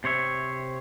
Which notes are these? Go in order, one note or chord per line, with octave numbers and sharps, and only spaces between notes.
C3 C5 C#5 E5